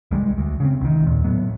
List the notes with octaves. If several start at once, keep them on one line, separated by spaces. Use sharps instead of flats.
C2 G3 G#3
D2
C#3 C4
C2 D#3
D#2 A#2
A2 F#3 B3